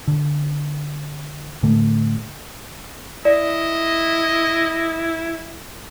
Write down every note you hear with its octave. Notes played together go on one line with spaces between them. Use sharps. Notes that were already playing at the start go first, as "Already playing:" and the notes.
D3
A2 D3 A3
E4 D5 D#5